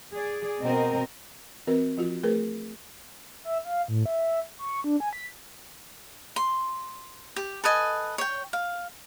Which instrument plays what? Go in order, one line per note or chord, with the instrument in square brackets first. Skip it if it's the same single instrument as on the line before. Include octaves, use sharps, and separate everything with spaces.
[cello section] G#4 D5
B2 C4 A#4 D#5
[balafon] E3 C4 F#4 A#4 B4
F3 F4 F#4
A3 G#4 A#4 B4
[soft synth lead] E5
F5
A2
E5
C#6
D4
G#5
B6
[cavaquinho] C6
G4
A4 B4 D#5 G#5
C#5 G5
F5